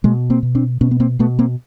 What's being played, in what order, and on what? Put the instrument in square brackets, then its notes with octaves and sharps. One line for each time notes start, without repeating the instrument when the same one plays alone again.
[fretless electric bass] B2 G#3 A#3
A#3 C4
B2
C4 D4
B2 B3 C#4
B3
A#3 C4
B2 A3 B3
A#3 C4